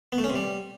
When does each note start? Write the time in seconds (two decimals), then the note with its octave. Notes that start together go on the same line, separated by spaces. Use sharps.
0.12 B3
0.18 A3
0.24 C#4
0.30 C3
0.36 G3